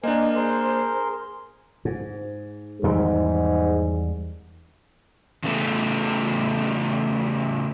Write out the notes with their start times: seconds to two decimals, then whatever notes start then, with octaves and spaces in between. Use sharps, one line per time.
0.03 A#3 D4 A#4 C5 D#5 G#5
0.36 G#4 A#4 C5 C6
1.85 G#2
2.83 E2 G#2 D#3 G3
5.44 C#3 E3 A3 B3